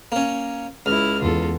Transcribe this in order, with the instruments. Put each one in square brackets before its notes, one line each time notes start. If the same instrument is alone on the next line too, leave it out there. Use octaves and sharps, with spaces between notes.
[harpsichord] A#3 C#4
[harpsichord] C#2 [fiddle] E4 F6
[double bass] E2 [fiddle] F4 A4